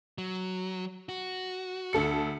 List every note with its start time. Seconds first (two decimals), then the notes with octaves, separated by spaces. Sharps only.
0.18 F#3
1.09 F#4
1.93 D2 A4 C#7